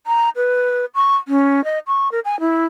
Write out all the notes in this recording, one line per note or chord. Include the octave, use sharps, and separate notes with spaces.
A#5
B4
C#6
C#4
D#5
C#6
A#4
G#5
E4